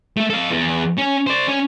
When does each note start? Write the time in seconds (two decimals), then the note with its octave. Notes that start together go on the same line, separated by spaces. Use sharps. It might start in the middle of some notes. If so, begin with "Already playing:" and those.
0.17 A3 A4
0.30 A4 F5
0.50 E2
0.98 C#4
1.27 C5 D5
1.47 C#4